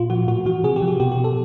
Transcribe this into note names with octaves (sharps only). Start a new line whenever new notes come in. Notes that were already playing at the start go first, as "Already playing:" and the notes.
Already playing: A#2 F4
F3 F#4
A2 F#4
E3 F#4
C3 G#4
G4
F3
F#4
B2 G4
G4
B2
A4